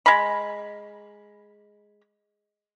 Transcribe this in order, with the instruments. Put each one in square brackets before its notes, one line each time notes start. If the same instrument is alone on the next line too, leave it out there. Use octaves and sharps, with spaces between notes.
[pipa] G#3 B5